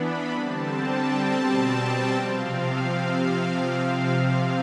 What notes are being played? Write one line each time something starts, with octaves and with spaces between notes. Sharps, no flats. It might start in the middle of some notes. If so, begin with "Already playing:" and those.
Already playing: E3 B3 D4 B5
D3 G3 C4 A5
G5
B2 G3 C4 A5
G5
C3 F3 C4 F5